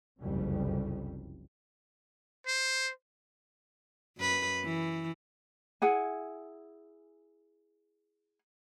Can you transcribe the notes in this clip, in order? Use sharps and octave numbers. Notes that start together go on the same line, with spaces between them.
F#1 C2 F2 C#3 G3
C5
F#2 B4
E3
E4 G#4 F#5 G#5